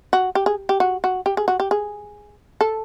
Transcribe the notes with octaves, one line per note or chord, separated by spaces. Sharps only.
F#4
G4
G#4
G4
F#4
F#4
G4
G#4
F#4
G4
G#4
A4